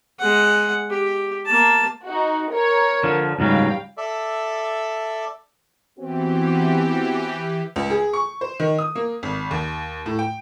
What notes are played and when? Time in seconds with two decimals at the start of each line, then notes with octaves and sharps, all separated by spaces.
0.19 G#3 F#5
0.90 G4
1.46 A#3 A5
2.05 D#4 F#4
2.52 A#4 C#5
3.03 D3 F3
3.39 C#2 G#2 F#3 G3 F5 G5
3.97 A4 D5 E5
5.99 E3 B3 C4 F#4 G4
7.76 C#2
7.90 G#4
8.13 C#6
8.41 C5
8.60 D#3
8.79 D#6
8.95 A#3
9.23 G#1
9.51 D#2
10.06 A2
10.19 G5